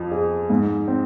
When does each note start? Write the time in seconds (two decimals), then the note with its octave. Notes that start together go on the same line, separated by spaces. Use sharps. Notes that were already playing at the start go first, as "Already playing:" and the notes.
Already playing: F2 F3
0.12 G#4
0.50 G#2
0.88 C4